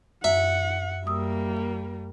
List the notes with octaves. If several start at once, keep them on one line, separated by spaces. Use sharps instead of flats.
F#2 E5 F#5
F#2 G3 A#3 D#6 E6